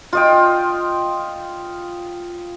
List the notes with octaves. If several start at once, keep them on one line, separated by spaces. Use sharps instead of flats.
F4 D#5 G5